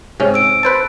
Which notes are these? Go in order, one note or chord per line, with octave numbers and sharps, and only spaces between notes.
G#2 C3 C#4
E6 D7
B4 C5 A5